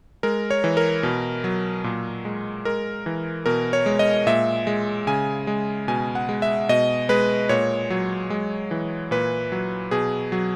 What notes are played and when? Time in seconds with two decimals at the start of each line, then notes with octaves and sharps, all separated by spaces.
0.23 G#3 A#4
0.51 C#5
0.64 E3
0.77 A#4
1.03 B2
1.44 F#3
1.84 A#2
2.25 G#3
2.65 G#3 A#4
3.06 E3
3.46 B2 A#4
3.73 C#5
3.86 G#3
3.99 D#5
4.27 A#2 E5
4.67 G#3
5.07 C#3 G#5
5.47 G#3
5.88 B2 G#5
6.15 F#5
6.29 G#3
6.42 E5
6.69 B2 D#5
7.09 G#3 B4
7.49 A#2 C#5
7.90 F#3
8.30 G#3
8.71 E3
9.11 A#2 B4
9.52 F#3
9.91 B2 G#4
10.32 F#3